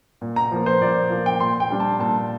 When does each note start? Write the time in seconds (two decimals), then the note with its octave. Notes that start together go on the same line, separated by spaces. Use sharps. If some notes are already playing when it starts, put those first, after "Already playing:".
0.21 A#2
0.36 A#5
0.52 F3 A#3
0.66 C5
0.81 A#2 D5
1.10 F3 A#3
1.26 G5
1.40 A#2 C6
1.60 G5
1.70 G3 D4
1.80 A5
1.99 A#2 A5